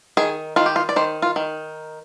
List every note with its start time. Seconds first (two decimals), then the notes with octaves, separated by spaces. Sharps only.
0.17 D#3 G#4
0.56 D#3 F4
0.66 G4
0.76 F4
0.89 D5
0.96 D#3 C5
1.22 F4
1.36 D#3